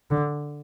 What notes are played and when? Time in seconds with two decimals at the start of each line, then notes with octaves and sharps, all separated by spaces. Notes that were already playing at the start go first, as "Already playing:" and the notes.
0.11 D3